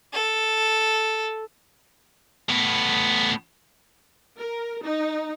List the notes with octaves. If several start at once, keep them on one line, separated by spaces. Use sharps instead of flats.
A4
A2 B3
A#4
D#4